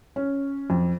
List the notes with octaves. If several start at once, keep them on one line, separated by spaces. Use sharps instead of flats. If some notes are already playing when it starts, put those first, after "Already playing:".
C#4
F2